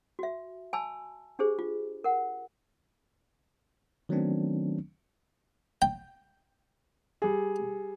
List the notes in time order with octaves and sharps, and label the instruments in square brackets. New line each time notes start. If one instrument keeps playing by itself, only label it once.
[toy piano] F#4 E5
G#5 A5 B5 E6
D4 G4 G#4 C5
F4
A#4 F#5
[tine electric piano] D#3 F#3 A3 B3 C4 D4
[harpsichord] G5
[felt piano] G3 G#4